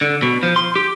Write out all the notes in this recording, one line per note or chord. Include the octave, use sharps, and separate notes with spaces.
D3
B2
F3
C6
G4